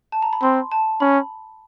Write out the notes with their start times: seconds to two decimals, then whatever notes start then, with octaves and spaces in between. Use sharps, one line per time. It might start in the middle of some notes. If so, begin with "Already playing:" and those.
0.12 A5
0.22 A#5
0.33 B5
0.42 C4 C6
0.72 A5
1.00 C#4 B5